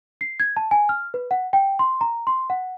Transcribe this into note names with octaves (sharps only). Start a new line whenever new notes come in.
C7
G#6
A5
G#5
F6
B4
F#5
G5
C6
A#5
C6
F#5